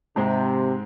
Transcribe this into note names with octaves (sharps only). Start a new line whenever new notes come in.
G#2 C3 G#3 C4 G#4 C5